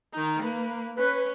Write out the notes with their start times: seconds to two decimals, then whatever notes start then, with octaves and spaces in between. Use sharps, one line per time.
0.13 D#3 D#4
0.42 A#3 B4
0.98 C#4 B4